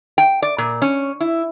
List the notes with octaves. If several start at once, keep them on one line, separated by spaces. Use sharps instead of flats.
G5
D5
A#2
C#4
E4